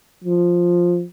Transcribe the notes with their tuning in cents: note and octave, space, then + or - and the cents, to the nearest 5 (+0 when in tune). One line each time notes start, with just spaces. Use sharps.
F3 +5